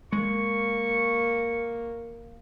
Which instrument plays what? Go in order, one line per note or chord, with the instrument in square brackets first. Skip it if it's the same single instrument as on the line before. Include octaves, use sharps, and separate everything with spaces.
[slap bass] G#3 [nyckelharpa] A#3 [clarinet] C#6